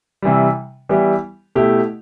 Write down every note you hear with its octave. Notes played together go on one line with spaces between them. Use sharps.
C3 E3 G3
E3 G3 B3 E4 G4
B2 A3 E4 G4